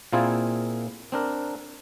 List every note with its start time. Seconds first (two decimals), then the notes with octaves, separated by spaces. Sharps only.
0.13 A#2 A#3 C4 E4 F4 G#4
1.12 C4 D4 A#4